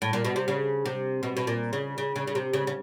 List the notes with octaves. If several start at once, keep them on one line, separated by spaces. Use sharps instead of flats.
A2
A#2
B2
C3
C#3
C3
B2
B2
A#2
C#3
C#3
C#3
C#3
C3
C#3
C#3